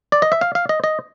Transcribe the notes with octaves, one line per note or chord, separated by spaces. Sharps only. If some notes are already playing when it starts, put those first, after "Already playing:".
D5
D#5
E5
F5
F5
D#5
D#5